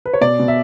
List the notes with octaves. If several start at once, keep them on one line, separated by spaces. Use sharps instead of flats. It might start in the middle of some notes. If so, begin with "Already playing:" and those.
B4
C#5
B2 D5
B2
E5